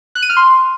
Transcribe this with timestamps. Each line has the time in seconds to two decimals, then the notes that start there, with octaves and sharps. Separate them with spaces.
0.15 F#6
0.22 D#7
0.29 F6
0.37 C6